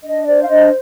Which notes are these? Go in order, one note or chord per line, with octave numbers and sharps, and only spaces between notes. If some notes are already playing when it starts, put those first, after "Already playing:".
D4 D#5
C5 D5
F5
D4 D#5